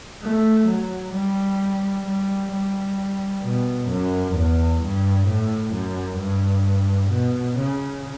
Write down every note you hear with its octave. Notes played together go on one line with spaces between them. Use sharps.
A3
F#3
G3
G3
G3
B2
F#2
E2
G2
A2
F#2
G2
B2
C#3